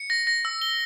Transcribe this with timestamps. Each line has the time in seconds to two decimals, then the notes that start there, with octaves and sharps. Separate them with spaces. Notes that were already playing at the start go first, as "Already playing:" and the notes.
Already playing: C#7
0.10 A#6
0.27 A#6
0.45 E6
0.62 G7